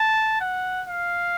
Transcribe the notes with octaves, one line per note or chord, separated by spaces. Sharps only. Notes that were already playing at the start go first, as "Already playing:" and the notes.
Already playing: A5
F#5
F5